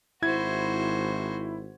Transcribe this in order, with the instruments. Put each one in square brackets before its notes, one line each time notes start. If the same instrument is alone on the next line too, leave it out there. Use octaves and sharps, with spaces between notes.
[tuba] G#1 [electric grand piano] E4 G#6 [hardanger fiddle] F#4 C5